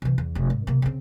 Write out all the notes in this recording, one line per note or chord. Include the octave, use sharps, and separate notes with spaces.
C3 E3
E2
F1 C3
G#2
C3 A#3
C#3 C4